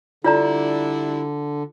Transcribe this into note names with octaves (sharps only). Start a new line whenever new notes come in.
D3 G3 D4 E4 F4 D5 A#5